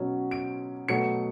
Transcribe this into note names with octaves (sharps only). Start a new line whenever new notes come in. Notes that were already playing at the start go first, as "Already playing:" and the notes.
Already playing: B2 F#3 C#4
D7
B2 F#3 A3 C#7